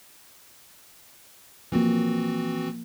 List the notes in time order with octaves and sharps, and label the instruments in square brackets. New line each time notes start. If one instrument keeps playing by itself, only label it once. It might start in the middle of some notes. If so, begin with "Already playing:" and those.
[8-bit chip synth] E3 C4 F#4 [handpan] F3 A#3